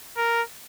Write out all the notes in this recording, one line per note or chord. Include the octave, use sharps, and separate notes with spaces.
A#4